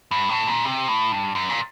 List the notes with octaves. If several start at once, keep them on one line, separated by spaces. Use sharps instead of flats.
G2
A2
A#2
C3
A2
G2
F#2
A#2